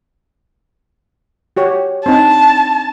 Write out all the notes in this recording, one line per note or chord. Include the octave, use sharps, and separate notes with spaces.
F#4 G4 C#5
C4 D4 D#4 A5